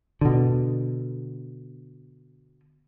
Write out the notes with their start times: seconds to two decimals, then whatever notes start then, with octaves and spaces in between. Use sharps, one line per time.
0.21 B2 D3